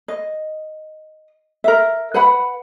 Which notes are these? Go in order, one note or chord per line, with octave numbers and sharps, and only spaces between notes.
D#5
A#4 E5
B4 F#5 B5